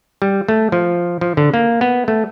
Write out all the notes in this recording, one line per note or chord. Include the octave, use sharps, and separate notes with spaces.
G3
A3
F3
F3
D3
A#3
B3
A3